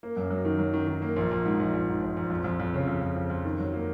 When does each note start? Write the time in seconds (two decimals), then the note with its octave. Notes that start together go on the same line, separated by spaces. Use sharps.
0.03 A#3
0.17 F#2
0.30 F#3
0.45 D#3
0.59 F#3
0.73 D#3
0.87 D#3
1.02 A#3
1.16 A#1
1.31 A#1
1.45 G#2
1.60 A#1
1.73 A#1
1.88 G#2
2.02 A#1
2.17 A#1
2.30 F2
2.44 F2
2.60 F2
2.74 C#3
2.88 F2
3.01 F2
3.16 F2
3.30 F2
3.45 D#3
3.59 F#3
3.73 A#3